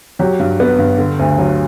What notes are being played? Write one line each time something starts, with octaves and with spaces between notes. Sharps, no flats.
F#3 G4
G2
B3
G2
D3
D2
F#3